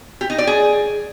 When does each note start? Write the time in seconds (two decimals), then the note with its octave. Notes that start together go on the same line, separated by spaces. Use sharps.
0.21 G4
0.30 D#4
0.38 D5
0.47 G#4